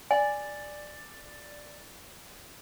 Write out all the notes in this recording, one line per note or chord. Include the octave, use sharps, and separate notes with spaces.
D5 G#5